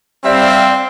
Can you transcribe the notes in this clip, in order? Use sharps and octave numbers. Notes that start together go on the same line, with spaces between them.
G3 C4 D5 E5 F5